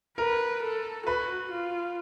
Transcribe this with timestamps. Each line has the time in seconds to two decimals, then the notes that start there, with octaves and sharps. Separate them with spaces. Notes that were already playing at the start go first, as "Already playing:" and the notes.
0.18 A#4 B4
0.63 A4
1.06 F#4 B4
1.51 F4